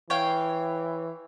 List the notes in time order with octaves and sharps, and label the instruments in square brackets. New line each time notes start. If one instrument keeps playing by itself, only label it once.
[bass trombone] E3 [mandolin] C#5 F5 G5